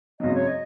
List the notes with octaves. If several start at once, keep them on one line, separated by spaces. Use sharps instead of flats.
G#1 F#2 C#3 F#3 D#5
C#5
D#5